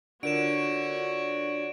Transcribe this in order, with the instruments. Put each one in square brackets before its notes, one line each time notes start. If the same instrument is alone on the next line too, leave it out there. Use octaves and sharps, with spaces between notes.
[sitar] D3 [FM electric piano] D4 F4 A#4 [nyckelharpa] F#4 C#5 [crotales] D7 E7